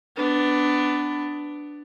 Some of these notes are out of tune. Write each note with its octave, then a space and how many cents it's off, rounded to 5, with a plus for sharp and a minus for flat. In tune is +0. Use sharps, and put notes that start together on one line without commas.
B3 +15 D4 +0